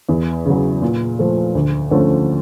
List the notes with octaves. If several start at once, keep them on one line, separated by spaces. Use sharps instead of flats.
E2
C#3 F#3
A#2
F3 A3
D2
D3 F3 A3 C#4